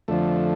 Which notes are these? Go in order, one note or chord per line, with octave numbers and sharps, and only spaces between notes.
F2 D3 F3 A3